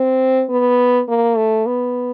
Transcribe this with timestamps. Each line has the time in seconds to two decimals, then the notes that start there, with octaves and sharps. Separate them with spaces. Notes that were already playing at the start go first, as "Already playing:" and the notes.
Already playing: C4
0.50 B3
1.08 A#3
1.37 A3
1.66 B3